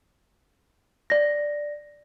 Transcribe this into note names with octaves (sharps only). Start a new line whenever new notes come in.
D5 A#6